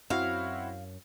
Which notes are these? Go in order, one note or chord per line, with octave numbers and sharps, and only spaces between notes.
F#2 C4 E4 F#4 F5